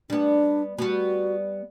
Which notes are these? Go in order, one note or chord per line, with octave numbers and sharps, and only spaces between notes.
G3 B3 D4
G3 B3 F#4